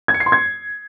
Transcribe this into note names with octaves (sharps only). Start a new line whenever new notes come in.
G#6
C#7
C7
C6
G#6